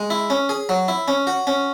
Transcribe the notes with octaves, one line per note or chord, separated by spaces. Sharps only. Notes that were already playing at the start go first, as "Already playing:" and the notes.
Already playing: G#3
E4
C#4
G#4
F#3
E4
C#4
F#4
C#4